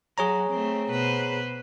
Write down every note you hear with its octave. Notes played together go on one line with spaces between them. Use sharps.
F#3 G#4 C#5 A#5
A3 C4
B2 B4 C5